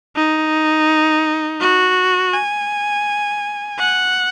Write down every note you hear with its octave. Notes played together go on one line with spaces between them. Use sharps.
D#4
F#4
G#5
F#5